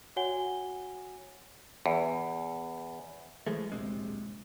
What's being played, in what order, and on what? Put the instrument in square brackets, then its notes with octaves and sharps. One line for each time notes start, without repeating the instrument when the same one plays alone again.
[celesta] F#4 C#5 F#5 G#5 G7
[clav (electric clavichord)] E2
[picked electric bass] E3 F3 G#3 A3
D1 A#1 C3 G#3